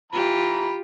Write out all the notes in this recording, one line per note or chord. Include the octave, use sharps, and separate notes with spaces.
E3 F4 G4 A#5 B5